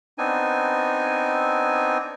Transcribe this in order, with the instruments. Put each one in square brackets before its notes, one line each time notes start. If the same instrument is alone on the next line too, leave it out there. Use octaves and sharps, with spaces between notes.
[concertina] B3 C4 D4 D#4 G#5